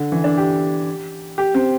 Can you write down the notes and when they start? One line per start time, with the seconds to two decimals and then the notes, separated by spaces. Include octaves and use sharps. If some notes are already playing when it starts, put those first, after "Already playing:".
Already playing: D3
0.12 E3
0.24 D4
0.38 G4
1.38 G4
1.54 C4